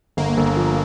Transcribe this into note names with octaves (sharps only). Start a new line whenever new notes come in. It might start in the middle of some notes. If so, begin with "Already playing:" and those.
G1 A#3
G1
F3